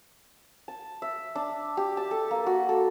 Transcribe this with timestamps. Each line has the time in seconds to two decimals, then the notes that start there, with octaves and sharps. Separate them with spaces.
0.68 A5
1.02 E5
1.35 D4
1.77 G4
1.97 A5
2.11 A4
2.31 A#3
2.46 F#4
2.69 A4